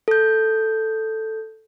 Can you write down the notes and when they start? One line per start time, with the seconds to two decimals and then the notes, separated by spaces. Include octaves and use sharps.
0.08 A4 G6